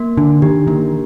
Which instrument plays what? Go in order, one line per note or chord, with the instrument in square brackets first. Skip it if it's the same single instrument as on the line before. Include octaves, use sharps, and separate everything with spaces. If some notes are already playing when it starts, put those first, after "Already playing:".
Already playing: [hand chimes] A#3
[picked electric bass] D3 [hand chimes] D4
[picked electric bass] D#3 [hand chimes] G4
[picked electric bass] D#3 [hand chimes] A#3